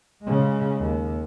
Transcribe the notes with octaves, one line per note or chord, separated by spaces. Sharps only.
C#3 G#3
D#2